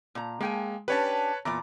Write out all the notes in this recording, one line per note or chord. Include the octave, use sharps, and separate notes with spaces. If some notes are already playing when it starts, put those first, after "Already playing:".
A#2 A#5
G#3 A#3 G5 G#5
C#4 D4 G4 B4 C#5 A5
E2 A#2 A#5 D6